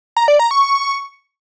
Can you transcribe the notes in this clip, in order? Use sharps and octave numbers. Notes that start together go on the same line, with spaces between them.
A#5
D5
A#5
C#6